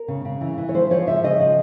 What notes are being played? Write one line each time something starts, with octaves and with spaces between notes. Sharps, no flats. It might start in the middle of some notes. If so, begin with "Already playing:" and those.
Already playing: A#4
C#3
C#3
E3
E3
C#5
F3 C5
F3 C#5
C#3 E5
C#3 D#5
F3